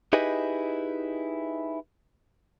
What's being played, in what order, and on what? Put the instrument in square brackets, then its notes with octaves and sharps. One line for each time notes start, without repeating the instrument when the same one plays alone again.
[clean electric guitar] D#4 E4 G4 G#4 B4 D#5